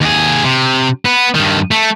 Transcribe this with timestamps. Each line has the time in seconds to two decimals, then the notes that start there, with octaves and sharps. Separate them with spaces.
0.01 D#2 G#4
0.44 C3
1.05 B3
1.35 G2 D#3
1.71 A3